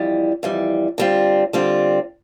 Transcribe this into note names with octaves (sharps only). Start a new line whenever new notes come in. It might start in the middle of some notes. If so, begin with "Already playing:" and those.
Already playing: F2 E3 G3
F2 E3 G3
D3 G3 C4 F4
D3 G3 C4 F4